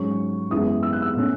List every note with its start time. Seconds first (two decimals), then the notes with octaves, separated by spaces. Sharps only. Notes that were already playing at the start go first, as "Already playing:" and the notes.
Already playing: G#2 F#3 C#4 C#6
0.50 F#2 E3 G#3 B3 D#6
0.83 E6
0.93 F#6
1.02 E6
1.17 B2 A3 C#4